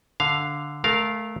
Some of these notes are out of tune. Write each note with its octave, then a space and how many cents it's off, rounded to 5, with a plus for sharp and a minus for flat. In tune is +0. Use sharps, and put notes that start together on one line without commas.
D3 +0 F5 +0
A3 -25 A#4 +0 F5 +0